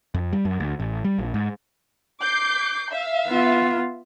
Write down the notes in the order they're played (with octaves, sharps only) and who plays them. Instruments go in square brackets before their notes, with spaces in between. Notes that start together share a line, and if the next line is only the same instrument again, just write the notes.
[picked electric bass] F2
G3
F#2
D2
A1
G3
A#1
G#2
[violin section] D6 G6 C7
E5 F5
[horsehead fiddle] B3 F4